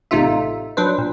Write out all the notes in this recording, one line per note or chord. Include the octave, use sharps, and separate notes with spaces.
A1 C3 A3 D#4 F4 E5
F#3 D4 B4 C5
A#2